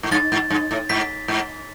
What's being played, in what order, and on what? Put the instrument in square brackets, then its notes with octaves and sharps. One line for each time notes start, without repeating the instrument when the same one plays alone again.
[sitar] G#2
[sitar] G2 [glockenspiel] A6
[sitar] G#2
G2
A2
[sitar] G#2 [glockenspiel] B6
[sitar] G#2